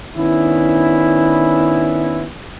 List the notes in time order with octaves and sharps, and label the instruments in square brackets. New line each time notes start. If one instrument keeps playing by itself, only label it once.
[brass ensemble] D#3 B3 C#4 D4 E4